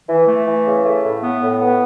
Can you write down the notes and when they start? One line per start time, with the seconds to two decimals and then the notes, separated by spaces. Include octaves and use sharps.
0.09 E3
0.27 A3
0.47 E3
0.66 C#3
0.85 A3
1.04 A2
1.22 B3
1.41 A2
1.61 B3